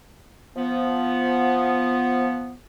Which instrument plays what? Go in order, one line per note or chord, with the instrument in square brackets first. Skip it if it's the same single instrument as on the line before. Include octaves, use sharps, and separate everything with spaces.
[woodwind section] F3 B3